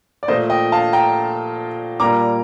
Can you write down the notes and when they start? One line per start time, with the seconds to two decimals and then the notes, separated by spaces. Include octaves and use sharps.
0.23 D5
0.28 A#2 F3 A3 C5 D#5
0.50 D#5 G5
0.72 F5 A5
0.93 G5 A#5
2.00 A#2 G3 A#3 A#5 D6